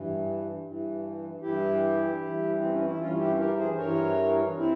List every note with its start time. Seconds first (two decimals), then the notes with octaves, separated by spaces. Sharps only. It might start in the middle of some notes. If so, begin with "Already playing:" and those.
Already playing: G2 E3
0.63 G2 E3
1.41 G2 E3 E4 G4
2.21 G2 E3
2.58 C4
2.72 C#4
2.85 E4
2.99 G2 E3 C#4 F4
3.18 E4 G4
3.38 G4 A#4
3.58 G#4 C5
3.78 G2 E3 A#4 C#5
4.57 C4 E4